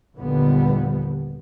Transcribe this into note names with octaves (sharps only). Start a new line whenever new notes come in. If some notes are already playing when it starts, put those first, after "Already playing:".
A#1 D#2 D3 F3 G3 B3